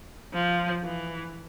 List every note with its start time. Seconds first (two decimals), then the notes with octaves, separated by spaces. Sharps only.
0.34 F3
0.84 E3